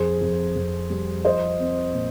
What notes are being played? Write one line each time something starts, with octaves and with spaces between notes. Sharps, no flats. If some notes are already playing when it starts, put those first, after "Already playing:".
Already playing: F2 G#4 C5
F2
F2
G3
F3 C5 D#5
C4
A#2